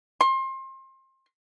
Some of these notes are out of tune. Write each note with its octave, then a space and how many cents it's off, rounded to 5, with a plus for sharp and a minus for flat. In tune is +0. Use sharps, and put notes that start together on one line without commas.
C6 +30